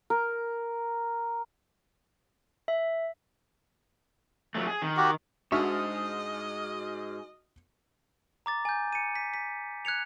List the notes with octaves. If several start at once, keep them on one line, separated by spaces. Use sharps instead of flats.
A#4
E5
F3 F#3 A3
G#4
D#3
F#4 G4
G#2 D4 F#4 D#5 E5 C#6 D#6 F6
A#5 D6 A6
G#5 G6
C#7 D#7
B6
B6
F#6 G#6 C#7 F7